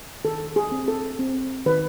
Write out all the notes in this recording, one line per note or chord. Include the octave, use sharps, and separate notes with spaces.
D#3 A4
G#4
C4
A4
C4
D#3 B4